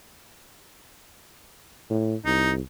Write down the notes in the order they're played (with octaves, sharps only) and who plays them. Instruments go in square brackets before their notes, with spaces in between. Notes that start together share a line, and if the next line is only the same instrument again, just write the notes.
[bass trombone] A2
[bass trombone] C2 [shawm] D#4